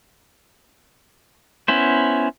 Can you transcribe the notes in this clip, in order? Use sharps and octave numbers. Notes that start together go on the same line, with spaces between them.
B3 C#4 E4 C5